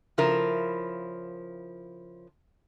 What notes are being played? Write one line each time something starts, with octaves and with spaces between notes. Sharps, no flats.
C#3 F3 E4 A#4